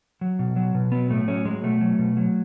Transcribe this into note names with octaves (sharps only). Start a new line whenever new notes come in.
F#3
B2
F#3
B2
F#3 B3
A2 A3
F#3 C#4
F#3 G#3
B2 A3
F#3
B2
F#3